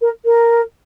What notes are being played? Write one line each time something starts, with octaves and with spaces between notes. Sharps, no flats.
A#4
A#4